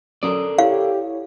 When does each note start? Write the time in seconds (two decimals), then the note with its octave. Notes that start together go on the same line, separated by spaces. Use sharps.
0.23 F#3 C#4 A4 A#4 D5 D#6
0.58 E4 G4 C#5 F5